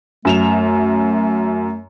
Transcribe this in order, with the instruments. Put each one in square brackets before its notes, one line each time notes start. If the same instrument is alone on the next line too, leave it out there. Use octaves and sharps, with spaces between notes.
[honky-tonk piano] F#2 E7 F7 [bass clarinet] A3